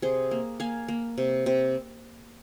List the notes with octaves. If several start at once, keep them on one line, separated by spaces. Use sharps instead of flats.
C3 G#4 C5
A#3
A#3 F5 G#5
A#3
C3
C3